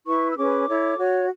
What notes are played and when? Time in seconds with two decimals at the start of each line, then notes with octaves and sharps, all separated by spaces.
0.06 E4 B4 C#6
0.29 E6
0.36 C#4 G#4 B4 D6
0.68 E4 A4 C#5
0.98 F#4 C#5